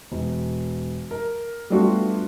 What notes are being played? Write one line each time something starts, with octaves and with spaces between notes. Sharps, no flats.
E1
A#4
G3 A3 B3 D4 F4 F#4